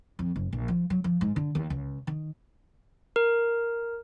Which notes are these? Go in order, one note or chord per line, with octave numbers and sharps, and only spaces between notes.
F2
F#1
A#1
F3
F#3
F3
G#2
D3
D#2
C#2
D#3
A#4